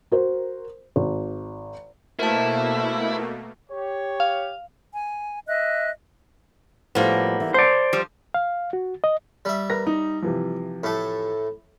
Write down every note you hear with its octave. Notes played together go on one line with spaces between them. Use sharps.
F#4 A#4 C5
G#1
B2 A3 A#3 E4 A#4 C5 A5
G4 C#5
F5
G#5
D#5 E5 F#6
A2 F3 G3 A#3 B3
E3
C5 D5 A5
F3 G3
F5
F#4
D#5
G3 E5
A#4 B4 A#6
D#4
C3 E3 F3
A2 A3